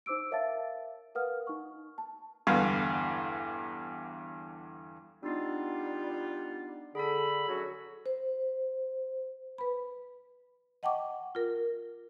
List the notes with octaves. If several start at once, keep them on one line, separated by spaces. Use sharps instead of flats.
D#4 C5 D6 E6 D7
A#4 C#5 E5 F5 A5 A6
A#4 B4 F5 F#5 D#6 F6
D#4 C#6
A5
E2 G2 D3 F5
G3 B3 D4 D#4 F4
D3 G#4 A4 B5
F#2 F#3 F#4
C5
B4 B5
D#5 F#5 G5 A5 C#6 D6
F4 A#4